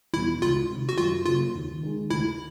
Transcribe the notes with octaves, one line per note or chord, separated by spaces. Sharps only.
E2 B2 G3 B3 E4
C#2 F4
C3 D#3
F#4
F#2 F4
C#3 F#3 A#3 F4
D#2
D#3 G#3
D2 E4